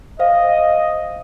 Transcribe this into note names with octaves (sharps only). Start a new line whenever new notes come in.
C5 D#5 F5